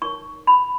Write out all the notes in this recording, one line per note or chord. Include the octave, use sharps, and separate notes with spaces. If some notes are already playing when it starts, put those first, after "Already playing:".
D#4 A#4 C#5 C#6
B5